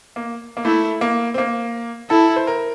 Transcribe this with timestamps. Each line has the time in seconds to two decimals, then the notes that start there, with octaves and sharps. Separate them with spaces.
0.16 A#3
0.57 A#3
0.65 A3 E4
1.01 A#3
1.34 C4
1.38 A#3
2.10 E4 A4
2.36 C5
2.47 A#4